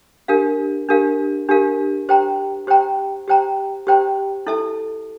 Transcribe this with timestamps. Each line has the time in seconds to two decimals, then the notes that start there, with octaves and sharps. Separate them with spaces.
0.28 D4 G4 A#4 F5
0.89 D4 G4 A#4 F5
1.49 D4 G4 A#4 F5
2.09 G4 C5 G5 A#5
2.67 G4 C5 G5 A#5
3.28 G4 C5 G5 A#5
3.87 G4 C5 G5 A#5
4.47 E4 A4 E5 A5